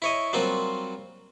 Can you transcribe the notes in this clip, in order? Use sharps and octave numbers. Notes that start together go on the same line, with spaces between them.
E4 C#5 D#5
F#3 G3 A#3 C4 F4